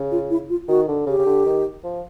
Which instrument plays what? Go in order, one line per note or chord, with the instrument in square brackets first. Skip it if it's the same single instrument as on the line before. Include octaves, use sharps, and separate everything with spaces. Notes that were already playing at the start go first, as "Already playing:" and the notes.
Already playing: [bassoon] C#3
[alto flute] F4
E4
F4
[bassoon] D#3 [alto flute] F#4
[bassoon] D3
[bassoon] C#3 [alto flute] G4
[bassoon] C#3
D3
D#3
F3